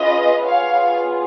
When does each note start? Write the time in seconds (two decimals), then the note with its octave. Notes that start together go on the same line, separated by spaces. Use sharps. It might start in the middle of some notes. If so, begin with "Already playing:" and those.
Already playing: C#4 F4 G#4 B4 D#5
0.44 B3 F4 G#4 C#5 F5